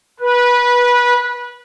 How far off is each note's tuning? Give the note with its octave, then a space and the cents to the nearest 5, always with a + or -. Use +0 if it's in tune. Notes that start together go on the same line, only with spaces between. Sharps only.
B4 -20